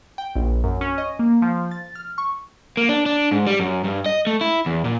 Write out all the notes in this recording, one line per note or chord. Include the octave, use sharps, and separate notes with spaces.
G5
A#1
F#2
C#4
D#5
A#3
F3
A6
F6
C#6
A#3
D4
D4
G#2
G3
F#2
G2
D#5
A3
E4
E2
A#2